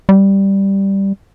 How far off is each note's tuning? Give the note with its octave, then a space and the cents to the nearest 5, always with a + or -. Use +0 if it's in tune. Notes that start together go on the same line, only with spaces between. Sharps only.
G3 +0